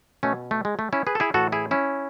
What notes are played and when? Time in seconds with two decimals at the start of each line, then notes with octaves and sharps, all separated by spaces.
0.23 B2 A3 C#4
0.51 A3
0.65 G#3
0.79 A3
0.93 C#4 E4
1.07 G#4 B4
1.15 A4
1.20 E4 G#4
1.34 A2 E3 F#4 A4
1.52 E4 G#4
1.71 C#4 E4